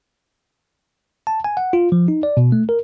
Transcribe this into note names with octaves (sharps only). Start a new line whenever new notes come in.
A5
G#5
F#5
F4
F3
D#4
D5
B2
A3
A#4